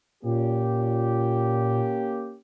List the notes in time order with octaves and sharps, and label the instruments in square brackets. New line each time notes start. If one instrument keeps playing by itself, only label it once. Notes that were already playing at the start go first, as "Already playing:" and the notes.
[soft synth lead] A#2 [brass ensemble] A#3 C#4 G4